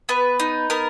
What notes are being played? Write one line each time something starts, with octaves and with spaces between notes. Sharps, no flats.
B3 B4
D#4
B3 A#4